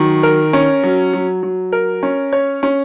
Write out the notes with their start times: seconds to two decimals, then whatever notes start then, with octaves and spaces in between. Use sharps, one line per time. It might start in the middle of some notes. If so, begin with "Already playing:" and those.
Already playing: D#3 F#3
0.23 A#4
0.53 C#4
0.83 F#3
1.13 F#3
1.43 F#3
1.73 A#4
2.03 C#4
2.33 C#5
2.63 C#4